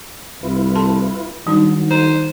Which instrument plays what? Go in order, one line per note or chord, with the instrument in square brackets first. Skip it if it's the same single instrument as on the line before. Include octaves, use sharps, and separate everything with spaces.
[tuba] C2 [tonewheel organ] E4 F4 B4
[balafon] A4 A5 C6
[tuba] D#3 [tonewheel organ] F#3 [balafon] G3 D4 D#4
[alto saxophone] C5 [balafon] A#5